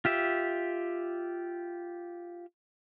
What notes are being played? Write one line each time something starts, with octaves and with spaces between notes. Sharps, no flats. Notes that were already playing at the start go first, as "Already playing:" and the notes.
F4 G4 E5